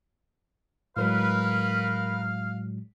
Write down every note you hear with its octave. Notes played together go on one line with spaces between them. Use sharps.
A2 F#3 G#3 A#4 B4 F5